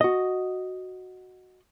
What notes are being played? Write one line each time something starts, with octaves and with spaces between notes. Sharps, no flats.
F#4 D#5